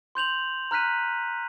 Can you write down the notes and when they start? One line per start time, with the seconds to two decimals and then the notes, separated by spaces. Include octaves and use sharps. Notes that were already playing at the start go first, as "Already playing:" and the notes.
0.15 C6 G6 F7 F#7
0.71 A#5 F6 F#6 B6 D#7